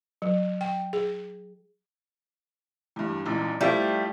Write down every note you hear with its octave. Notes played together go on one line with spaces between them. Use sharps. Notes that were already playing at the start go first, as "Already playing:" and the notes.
F#3
G5
G#4
E2 G2
D#1 G#1 E2
F3 G3 A3 E4 F4